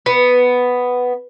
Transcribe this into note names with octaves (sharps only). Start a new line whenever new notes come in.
B3